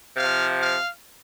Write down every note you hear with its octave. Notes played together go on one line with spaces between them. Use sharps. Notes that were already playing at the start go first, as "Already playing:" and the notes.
C3 F3 F5
F5